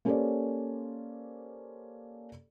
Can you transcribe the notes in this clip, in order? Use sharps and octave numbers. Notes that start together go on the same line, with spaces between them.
A#3 C#4 G4 A4 C5 D5